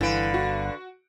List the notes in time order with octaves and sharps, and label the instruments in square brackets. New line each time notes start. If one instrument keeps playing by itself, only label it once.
[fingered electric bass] G1 [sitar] D3 B4 [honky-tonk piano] E3 D7 [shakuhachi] F5
[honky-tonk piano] F#4